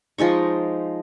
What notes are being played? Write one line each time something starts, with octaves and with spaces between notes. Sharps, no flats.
F3 G#3 D#4 C#6